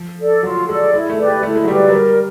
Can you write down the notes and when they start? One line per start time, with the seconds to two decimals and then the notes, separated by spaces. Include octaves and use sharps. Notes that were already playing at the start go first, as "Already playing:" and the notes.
Already playing: F3
0.18 A4 D5
0.43 F#3 F4
0.68 G#3 A4 D5
0.93 G#3 E4
1.10 A3
1.18 G4 B4 D5
1.27 G#3
1.43 A3 E4
1.55 G#3
1.64 F#3
1.68 G3 G4 B4 D5
1.88 F#3
1.92 G3 A#4